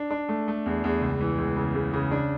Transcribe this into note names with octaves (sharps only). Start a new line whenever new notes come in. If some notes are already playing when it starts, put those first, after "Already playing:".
Already playing: D4
D4
A3
A3
E2
E2
C#2
E3
C#2
C#3
C#3
C#3
D4